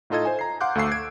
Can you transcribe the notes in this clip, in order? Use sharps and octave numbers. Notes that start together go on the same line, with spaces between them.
A2 D#4 F4 A4 D#5 G#6
C5 G#5
A#5 C7
F5 F#5 C6 D6 F#6 G6
D2 A3 F5 C#6 E6 C7
G#6 D7